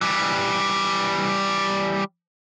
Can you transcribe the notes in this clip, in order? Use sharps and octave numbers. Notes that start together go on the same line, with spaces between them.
E3 G3